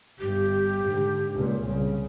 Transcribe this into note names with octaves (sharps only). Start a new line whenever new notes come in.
G1 G2 G4
G#2 D3
C#2 A#2
C2 C#3